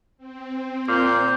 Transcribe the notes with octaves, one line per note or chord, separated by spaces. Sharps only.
C4
A#2 G6